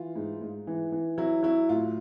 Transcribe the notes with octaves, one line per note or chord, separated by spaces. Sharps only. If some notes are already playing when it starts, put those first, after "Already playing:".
Already playing: E3 F4
G#2
G#2
E3
E3
F#3 E4
F#3 E4
A2 F4